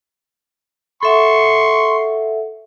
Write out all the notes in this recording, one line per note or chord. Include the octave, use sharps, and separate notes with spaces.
A4 E5 F#5 C6 C#6